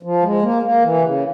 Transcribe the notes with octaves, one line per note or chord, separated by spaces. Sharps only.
F3
G#3
A#3
A#3
E3
C3
C#3